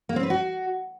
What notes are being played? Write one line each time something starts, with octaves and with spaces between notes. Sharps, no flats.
A#3
C4
B4
F#4